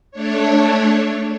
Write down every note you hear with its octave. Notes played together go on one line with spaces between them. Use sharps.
A3 D4 C#5